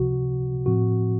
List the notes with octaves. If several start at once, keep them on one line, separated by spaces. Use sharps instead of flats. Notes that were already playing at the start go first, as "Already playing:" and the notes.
Already playing: C#2 C3 F3 F#4
A2 F3 C4 F#4